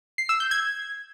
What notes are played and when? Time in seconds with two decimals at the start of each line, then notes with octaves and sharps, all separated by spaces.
0.18 C7
0.29 E6
0.40 G6
0.51 G#6